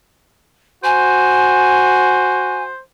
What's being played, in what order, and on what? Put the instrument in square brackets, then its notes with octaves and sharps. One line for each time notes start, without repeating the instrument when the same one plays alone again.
[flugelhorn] F#4 [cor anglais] C5 [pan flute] G#5